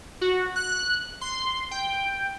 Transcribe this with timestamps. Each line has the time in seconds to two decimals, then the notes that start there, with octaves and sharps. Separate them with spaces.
0.21 F#4
0.56 F#6
1.21 C6
1.71 G5